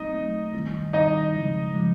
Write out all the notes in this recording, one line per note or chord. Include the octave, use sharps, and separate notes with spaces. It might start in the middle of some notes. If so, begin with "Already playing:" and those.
Already playing: F#3 A3 C4 D#4 D#5
F#3 A3 C4
D#3 G3 C4 E4
D#3 G3 C4 D#4 E4 D#5
C#3 F3 G#3
C#3 F3 G#3